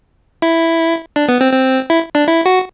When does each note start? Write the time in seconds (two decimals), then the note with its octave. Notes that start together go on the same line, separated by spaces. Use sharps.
0.42 E4
1.16 D4
1.28 B3
1.41 C4
1.53 C4
1.90 E4
2.15 D4
2.27 E4
2.46 F#4